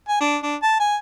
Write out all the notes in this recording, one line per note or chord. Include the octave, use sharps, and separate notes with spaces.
G#5
D4
D4
A5
G#5